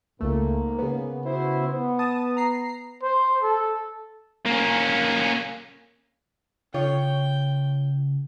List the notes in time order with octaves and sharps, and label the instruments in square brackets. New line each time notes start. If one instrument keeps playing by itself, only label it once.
[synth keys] C#2 A3 [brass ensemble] G#2 A#3
[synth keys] C#3 B3
[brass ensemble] E4 F#4 C5
B3
[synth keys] A5 D#6
A#5 C7
[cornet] C5
A4
[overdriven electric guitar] A#3 C#4
[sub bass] C#3 [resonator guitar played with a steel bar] F4 C#5 [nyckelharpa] G5